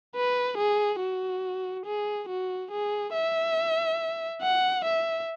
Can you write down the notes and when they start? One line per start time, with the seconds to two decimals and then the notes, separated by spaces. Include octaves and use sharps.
0.16 B4
0.58 G#4
1.00 F#4
1.86 G#4
2.29 F#4
2.71 G#4
3.13 E5
4.42 F#5
4.85 E5